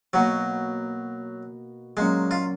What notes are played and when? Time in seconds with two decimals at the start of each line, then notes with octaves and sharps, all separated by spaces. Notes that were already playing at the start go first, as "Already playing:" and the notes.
0.13 B2 F#3 A#3 D#4 F#4
1.97 A#2 F#3 G#3 C#4
2.31 F4